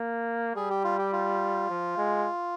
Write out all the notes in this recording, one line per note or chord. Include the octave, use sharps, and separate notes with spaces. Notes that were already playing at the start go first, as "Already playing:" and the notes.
Already playing: A#3
G3 G#4
G4
F4
G4
F4
F3
G#3